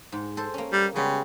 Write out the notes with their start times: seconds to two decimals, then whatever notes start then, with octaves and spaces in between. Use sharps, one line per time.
0.12 G#2
0.37 A4 C5
0.54 A#3 C#4
0.72 G3
0.96 C#3 G3 G#3 B3